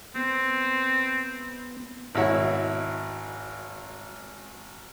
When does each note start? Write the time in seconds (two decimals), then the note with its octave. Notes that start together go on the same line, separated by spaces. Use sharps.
0.15 B3 C4
2.15 G#1 B2 E4 C#5 E5